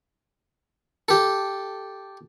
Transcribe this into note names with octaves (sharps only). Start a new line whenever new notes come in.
G4 A4